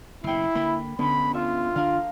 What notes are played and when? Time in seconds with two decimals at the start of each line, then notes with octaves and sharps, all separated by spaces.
0.24 F#1 B2 E4 G5 C7
0.55 D3 A#3 B5
0.99 D2 B3 C#4 B5
1.34 F4 E5
1.76 D3 D4 F5 A#5